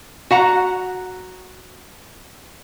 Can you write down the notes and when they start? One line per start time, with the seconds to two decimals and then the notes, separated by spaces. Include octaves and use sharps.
0.31 F#4 F#5 A#5